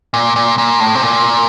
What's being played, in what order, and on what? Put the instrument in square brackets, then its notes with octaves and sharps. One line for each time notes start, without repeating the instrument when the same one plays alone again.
[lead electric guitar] A#2
A#2
A#2
A2
C3
A#2